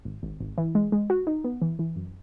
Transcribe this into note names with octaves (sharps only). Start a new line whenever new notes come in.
G#1
G#1
G#1
E3
G#3
G#3
F#4
D#4
B3
E3
E3
F#2